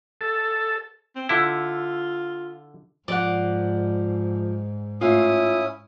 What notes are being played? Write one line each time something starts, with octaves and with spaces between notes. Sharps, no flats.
A4
C4
D3 E4 F4
G#2 F3 D5 F#5
A2 C#4 E4 F4 F5 D#6